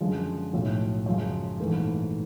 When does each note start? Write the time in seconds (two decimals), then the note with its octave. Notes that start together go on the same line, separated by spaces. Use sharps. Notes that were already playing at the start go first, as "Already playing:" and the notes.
0.01 F#2 D3 F3 G#3
0.53 B1 A2 F3
1.06 F#2 C#3 F3 G#3
1.60 A#1 G#2 E3 A3